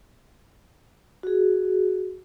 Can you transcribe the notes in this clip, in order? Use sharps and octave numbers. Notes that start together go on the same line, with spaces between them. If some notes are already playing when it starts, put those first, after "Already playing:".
F#4 G#4